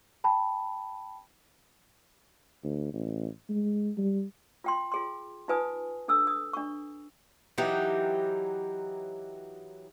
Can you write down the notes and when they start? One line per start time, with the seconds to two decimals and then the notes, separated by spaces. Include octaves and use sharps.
0.24 G5 A5 B5
2.63 D2
2.94 A1
3.49 G#3
3.97 G3
4.64 F4 G5 C6
4.92 F4 G#4 C6
5.48 D#4 F4 B4 G#5 D#6
6.08 D4 A4 D#6 E6
6.27 D#6
6.53 D4 C#6
7.58 E3 F#3 D#4 G4